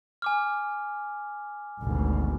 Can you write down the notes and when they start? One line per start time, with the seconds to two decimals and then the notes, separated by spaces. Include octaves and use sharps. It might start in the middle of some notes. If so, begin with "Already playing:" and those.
0.22 G#5 D6 F6
1.81 G#1 D2 B2